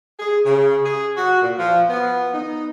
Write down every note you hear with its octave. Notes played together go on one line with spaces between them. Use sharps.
G#4
C#3
G#4
F#4
A#2
F3
B3
D#4